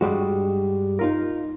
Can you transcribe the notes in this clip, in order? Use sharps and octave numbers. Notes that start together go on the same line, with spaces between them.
G2 G3 G#3 F#4
D#4 F4 A#4